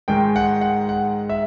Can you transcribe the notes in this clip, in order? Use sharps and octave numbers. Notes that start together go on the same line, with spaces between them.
G#2 D#3 G#3 G5
F#5
F#5
F#5
E5